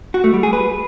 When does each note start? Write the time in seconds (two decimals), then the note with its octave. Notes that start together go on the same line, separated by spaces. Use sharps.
0.14 F#4
0.24 A3
0.34 G3
0.43 G#4
0.53 B4